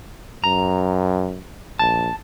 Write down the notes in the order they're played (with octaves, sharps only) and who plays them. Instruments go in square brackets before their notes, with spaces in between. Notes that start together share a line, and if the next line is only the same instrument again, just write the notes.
[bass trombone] F#2 [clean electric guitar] A#5
[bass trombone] A#1 [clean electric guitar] A5